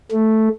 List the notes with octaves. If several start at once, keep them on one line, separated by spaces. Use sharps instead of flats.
A3